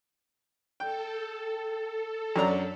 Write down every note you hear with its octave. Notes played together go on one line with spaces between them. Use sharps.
A4 G5
F#2 D4 A#5